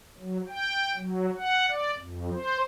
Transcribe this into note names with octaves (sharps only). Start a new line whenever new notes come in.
F#3
G5
F#3
F#5
D5
F2
C5